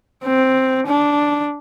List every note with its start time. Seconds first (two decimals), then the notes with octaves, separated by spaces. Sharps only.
0.23 C4
0.86 D4